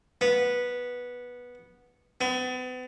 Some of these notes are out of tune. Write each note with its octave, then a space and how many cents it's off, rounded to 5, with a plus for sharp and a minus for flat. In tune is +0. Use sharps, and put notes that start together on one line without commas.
B3 -10
B3 +40